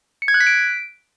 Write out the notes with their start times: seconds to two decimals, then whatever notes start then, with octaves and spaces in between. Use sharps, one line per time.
0.22 C#7
0.28 G#6
0.34 F#6
0.40 B6
0.47 D7